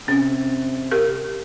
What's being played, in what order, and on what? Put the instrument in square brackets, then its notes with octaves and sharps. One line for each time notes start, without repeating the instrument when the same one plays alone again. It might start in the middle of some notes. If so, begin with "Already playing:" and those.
[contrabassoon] C3 [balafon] C#4
[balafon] G4 A#4